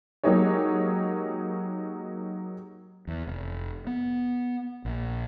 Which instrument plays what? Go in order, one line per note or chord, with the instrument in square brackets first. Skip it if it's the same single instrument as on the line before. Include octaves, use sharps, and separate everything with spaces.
[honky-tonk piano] F#3 G#3 A#3 D#4 G4 C#5
[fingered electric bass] E2
F1
B3
A#1